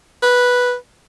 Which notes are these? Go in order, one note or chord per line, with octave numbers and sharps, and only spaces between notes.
B4